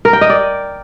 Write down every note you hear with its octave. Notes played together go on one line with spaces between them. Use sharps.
A#4
G5
D#5
D5